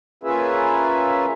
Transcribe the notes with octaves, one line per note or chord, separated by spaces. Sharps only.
A#3 C#4 F4 G#4 B4 E5